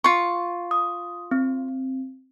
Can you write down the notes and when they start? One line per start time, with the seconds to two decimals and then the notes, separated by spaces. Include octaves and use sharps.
0.04 F4 C#6
0.71 D#6
1.31 C4